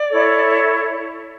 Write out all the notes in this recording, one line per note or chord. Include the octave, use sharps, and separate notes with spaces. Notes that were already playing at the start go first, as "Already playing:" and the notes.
Already playing: D5
E4 A4 C#5